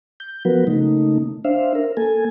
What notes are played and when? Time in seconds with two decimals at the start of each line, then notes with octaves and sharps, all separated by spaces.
0.20 G6
0.45 F3 F#3 B3 F#4 A#4 B4
0.67 C#3 A3 A#3 D#4
1.44 D4 C5 E5 F5
1.75 A#4
1.97 A#3 A4 G#5